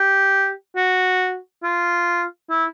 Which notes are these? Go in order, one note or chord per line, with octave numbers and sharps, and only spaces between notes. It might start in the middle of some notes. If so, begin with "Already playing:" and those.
Already playing: G4
F#4
F4
E4